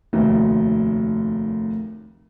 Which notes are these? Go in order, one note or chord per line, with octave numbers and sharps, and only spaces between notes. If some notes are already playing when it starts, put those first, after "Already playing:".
F1 D#2 F#3 A3